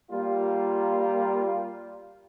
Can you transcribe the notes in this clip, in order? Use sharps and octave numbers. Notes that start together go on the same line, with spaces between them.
G3 A#3 F4